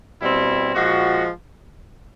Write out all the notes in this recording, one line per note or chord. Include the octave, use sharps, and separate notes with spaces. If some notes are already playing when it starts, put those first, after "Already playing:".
B2 G3 C4 E4
A#2 F3 G#3 F#4